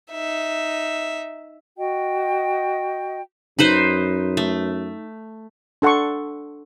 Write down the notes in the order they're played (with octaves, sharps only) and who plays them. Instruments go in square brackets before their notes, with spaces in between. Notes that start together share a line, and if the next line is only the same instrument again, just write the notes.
[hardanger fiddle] D#4 E5
[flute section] F#4 D#5 G5
[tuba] F#2 [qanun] D#4 B4 C5
[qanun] A3
[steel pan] D4 A4 F#5 C6 C#6